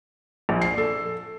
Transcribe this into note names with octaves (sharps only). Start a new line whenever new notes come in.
A#1
C7
A4